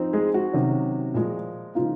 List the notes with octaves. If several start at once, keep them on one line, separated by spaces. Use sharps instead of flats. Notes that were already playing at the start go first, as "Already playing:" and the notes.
Already playing: F3 C4 D#4
G#3 G#4
F#4
C3 D#3 F#3 C#4
A#2 F3 G#3
C#3 F3 A#3 D#4 F4